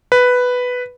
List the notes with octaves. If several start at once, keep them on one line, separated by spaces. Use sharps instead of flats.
B4